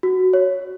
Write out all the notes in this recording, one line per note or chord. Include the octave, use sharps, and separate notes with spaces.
F#4
C#5